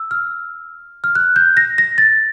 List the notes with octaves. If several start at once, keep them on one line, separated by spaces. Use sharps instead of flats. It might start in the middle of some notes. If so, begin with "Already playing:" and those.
Already playing: E6
F6
F6
F#6
G6
A#6
A#6
A6